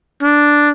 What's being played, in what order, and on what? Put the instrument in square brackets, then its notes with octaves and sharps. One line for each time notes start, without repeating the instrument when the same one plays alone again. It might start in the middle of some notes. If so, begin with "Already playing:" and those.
[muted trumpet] D4